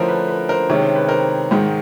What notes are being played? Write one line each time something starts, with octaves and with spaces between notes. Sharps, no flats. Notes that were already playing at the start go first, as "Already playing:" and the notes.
Already playing: D3 F3 A3 C#4 E4 A#4 C5
B4
B4
A#4 C5
C3 D#3 G#3 C#4 C#5
C5
B4
A#4 C5
G#2 D#3 G#3